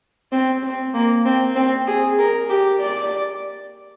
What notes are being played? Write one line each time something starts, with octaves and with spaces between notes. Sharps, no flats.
C4
C4
A#3
C4
C4
G#4
A#4
G4
D5